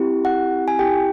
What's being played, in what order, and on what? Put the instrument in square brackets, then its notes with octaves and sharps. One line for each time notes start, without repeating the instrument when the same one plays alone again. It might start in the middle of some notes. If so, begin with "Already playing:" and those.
Already playing: [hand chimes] C4 E4 G4
F#5
G#5
C4 E4 G4 G5